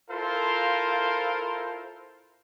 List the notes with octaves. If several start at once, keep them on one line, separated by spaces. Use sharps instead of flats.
E4 F4 A4 A#4 C5 F5